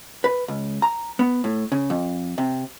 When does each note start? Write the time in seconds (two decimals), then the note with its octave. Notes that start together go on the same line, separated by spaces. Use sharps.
0.24 B4
0.48 C#2
0.82 A#5
1.19 B3
1.44 A2
1.72 C#3
1.90 F2
2.38 C3